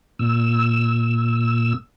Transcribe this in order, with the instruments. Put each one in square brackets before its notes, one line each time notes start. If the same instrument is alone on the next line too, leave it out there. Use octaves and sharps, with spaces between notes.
[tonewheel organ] A#2 E6